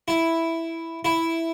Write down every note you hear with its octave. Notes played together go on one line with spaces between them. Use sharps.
E4
E4